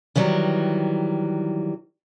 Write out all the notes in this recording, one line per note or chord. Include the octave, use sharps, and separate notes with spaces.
D#3 E3 F#3 G3